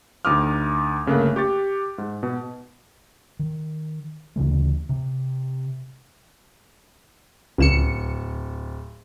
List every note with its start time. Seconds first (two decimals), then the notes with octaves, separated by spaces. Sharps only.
0.25 D2 D#4 D6 D#6 F6
1.06 G1 C#3 A3 A#3 F#6
1.36 G4 C#6 A6
1.98 G#2
2.23 B2
3.39 D#3
4.36 D2 C#3 E3 A3
4.89 C3
7.58 D1 C#2 C#7 E7